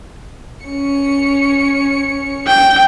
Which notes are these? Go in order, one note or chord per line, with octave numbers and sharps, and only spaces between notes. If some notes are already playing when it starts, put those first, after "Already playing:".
C#4 C#7
G5